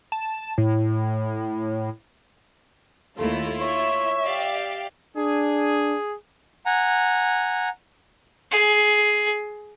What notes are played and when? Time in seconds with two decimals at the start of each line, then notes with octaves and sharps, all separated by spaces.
0.12 A5
0.58 A2
3.16 D#2 A3 E4 F4
3.60 C#5 E5
4.24 G4 D5 F5
5.17 D4 G#4
6.66 F#5 G#5 A#5
8.51 G#4